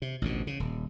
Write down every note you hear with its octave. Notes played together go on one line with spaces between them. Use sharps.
C3
A1 D2 B2
C#3
D#1